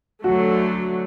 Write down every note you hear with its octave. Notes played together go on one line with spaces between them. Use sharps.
D2 D3 F#3 A3 F#4